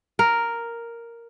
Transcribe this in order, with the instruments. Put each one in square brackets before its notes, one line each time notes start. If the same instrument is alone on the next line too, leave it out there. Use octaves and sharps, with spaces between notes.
[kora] A#4